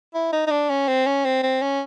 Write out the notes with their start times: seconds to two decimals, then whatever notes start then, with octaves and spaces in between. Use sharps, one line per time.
0.14 E4
0.33 D#4
0.47 D#4
0.51 D4
0.70 C#4
0.88 C4
1.06 C#4
1.25 C4
1.43 C4
1.62 C#4